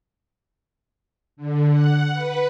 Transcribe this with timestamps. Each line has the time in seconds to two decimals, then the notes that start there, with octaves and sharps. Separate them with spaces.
1.37 D3
1.70 F#5
2.13 B4